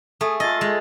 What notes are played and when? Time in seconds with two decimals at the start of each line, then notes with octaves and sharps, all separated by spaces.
0.21 A3 G#4 D#6
0.40 F4 G#4 A4 D#5 A6
0.61 G#3